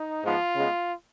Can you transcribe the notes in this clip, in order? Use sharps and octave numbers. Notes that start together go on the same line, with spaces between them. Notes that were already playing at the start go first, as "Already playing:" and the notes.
Already playing: D#4
G#2 F3 G#3 B3 F4
C#3 G#3 B3